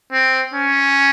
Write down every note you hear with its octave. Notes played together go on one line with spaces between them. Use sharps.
C4
C#4